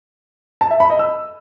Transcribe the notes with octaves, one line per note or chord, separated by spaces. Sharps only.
A5
E5
B5
D#5
E6